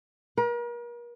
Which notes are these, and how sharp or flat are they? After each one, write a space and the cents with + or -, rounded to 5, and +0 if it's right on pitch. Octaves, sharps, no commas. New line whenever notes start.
A#4 +40